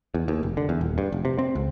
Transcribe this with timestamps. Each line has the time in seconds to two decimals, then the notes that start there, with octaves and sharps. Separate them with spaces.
0.14 E2
0.28 D#2
0.43 F1
0.57 D3
0.69 E2
0.81 D#1
0.98 G2
1.12 F1
1.25 C3
1.39 C4
1.55 C#2